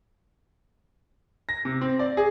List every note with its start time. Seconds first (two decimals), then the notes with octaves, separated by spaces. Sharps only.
1.49 A#6
1.65 C3
1.81 C4
1.99 D5
2.17 G#4